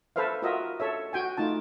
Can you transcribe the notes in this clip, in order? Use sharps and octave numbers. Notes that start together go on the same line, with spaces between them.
A4 B4 C5 E5 F5
F4 F#4 A#4 D#5 E5
A4 C#5 E5
F#4 G5 G#5
A3 D#4 F4 A5